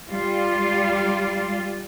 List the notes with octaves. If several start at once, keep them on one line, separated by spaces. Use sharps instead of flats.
G3 F4